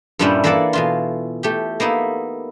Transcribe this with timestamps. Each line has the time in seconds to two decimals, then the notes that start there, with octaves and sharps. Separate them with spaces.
0.19 G2 A#2 G3 C#4 D4 E4
0.44 E3 A#3 A4 D5 F#5 A5
0.73 B2 E3 F4
1.43 A3 G4
1.80 A#3 B3 D#4 E4